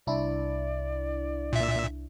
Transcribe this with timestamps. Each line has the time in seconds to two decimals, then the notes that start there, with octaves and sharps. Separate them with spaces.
0.07 C2 D4 E4 D5
1.53 A#2 E5